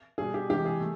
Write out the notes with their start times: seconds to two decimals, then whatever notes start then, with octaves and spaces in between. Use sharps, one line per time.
0.18 B2 G3 G#4
0.34 G4
0.50 C3 E3 G#3 G4
0.65 G#4
0.80 A3